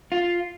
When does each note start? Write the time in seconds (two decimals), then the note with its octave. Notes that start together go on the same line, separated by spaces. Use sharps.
0.12 F4